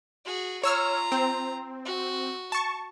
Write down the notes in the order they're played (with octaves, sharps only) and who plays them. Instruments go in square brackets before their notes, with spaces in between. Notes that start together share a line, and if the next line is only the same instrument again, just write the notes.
[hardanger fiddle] F#4 G#4
[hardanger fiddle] F4 A#5 [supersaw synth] C#5 E6 F6
[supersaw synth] C4
[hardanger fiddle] F#4
[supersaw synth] A5 C#6